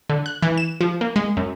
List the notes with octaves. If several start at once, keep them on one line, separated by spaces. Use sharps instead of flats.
D3
F#6
E3
E7
F3
A#3
G#3
F#2